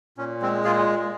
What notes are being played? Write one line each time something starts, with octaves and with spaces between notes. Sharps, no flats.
A#2 C#4
G#3 C4
A#2 F4 G#4